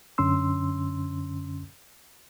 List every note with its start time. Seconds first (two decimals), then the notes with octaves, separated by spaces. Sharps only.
0.18 F#2 D3 C#4 C6 E6